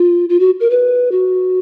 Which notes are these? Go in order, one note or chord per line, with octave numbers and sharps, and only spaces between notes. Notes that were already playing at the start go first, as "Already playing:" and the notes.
Already playing: F4
F4
F#4
A#4
B4
F#4